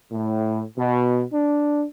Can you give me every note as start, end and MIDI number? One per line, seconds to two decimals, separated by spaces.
0.12 0.62 45
0.78 1.22 47
1.33 1.85 62